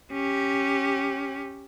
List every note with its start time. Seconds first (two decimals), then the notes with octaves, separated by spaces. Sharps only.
0.12 C#4 G4